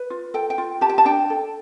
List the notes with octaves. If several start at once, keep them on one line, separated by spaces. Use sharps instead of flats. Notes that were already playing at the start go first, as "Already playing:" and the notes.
Already playing: B4
F4
A4 G5
G5
F4
G4 A5
G5
A5
D4 G5
A4